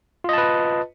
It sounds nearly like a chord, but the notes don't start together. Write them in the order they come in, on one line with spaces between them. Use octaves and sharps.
F4 D#5 A5 B4